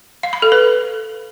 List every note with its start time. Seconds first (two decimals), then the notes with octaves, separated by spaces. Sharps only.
0.23 F5
0.33 B5
0.42 A4
0.52 B4